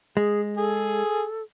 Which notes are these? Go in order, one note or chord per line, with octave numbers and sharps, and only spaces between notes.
G#3 G#4
G#4 A4